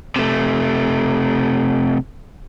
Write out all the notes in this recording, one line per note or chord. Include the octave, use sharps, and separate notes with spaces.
C3 A3